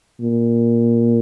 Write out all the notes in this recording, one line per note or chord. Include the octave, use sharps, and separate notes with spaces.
A#2